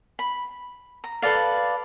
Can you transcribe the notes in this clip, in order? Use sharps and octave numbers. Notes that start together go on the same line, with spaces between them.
B5
A#5
A4 B4 D5 F5